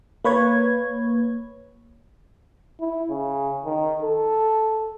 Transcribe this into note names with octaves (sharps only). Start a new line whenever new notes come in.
A#3 B4 C#5 G#6
E4
C#3
D#3
A4